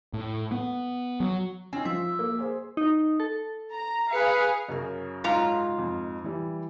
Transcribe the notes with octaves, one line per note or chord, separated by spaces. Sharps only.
A2
B3
F#3
C4 C#4 D#4
F3 E5
A#3
G#4 C5
D#4
A4
A#5
G#4 B4 F5 C#7
F#2 C#3 A#4
G#2 F4 A#5
F2
E3 G3